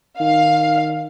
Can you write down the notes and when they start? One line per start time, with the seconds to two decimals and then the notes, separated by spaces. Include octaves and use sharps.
0.20 D#3 F5